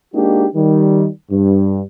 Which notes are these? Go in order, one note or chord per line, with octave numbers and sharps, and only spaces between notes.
G#3 A#3 D4 D#4 F#4 G4
D#3 G3
G2